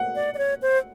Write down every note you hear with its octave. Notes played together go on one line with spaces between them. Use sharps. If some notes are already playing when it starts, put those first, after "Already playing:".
Already playing: F#5
D5
D5
C#5
C5